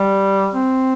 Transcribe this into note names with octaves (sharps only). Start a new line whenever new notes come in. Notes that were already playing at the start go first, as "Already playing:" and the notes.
Already playing: G3
C4